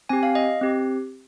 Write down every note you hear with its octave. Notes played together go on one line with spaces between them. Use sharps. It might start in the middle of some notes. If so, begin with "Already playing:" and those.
C4 G4 G#5
F5
D#5
C4 G4